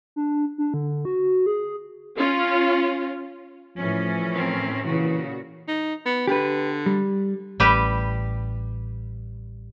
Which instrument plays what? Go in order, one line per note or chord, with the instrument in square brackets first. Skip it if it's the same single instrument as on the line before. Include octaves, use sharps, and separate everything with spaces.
[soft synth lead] D4
D4
D3
F#4
G#4
[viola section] C#4 F4
[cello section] A2 E3 C#4 [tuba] F3
[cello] C4 A#4
[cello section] A#2 F#4 [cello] C#3 [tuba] E3
[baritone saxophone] D#4
B3
[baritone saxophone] D3 [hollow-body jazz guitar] G4 B4
[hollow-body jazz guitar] G3
[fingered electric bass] A1 [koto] G3 G4 B4